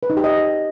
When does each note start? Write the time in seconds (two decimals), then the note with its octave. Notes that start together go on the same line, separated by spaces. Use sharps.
0.03 B4
0.10 D#4
0.17 G4
0.24 D#5